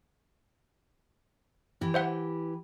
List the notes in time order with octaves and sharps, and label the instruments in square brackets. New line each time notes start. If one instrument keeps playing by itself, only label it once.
[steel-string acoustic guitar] E3 G4
[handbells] C5 E5 F#5